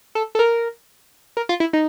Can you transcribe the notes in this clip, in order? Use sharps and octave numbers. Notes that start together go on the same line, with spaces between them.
A4
A4
A#4
A#4
F4
E4
D#4